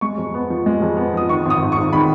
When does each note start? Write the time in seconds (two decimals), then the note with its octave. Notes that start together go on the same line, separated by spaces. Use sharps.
0.01 G#3 C#6
0.18 F2
0.34 B3
0.50 F3
0.66 G#3
0.82 F2
0.97 B3
1.14 F3 D#6
1.29 D#3 C#6
1.46 G#1 D#6
1.62 G#1
1.72 G#2 C#6
1.93 D#3 B5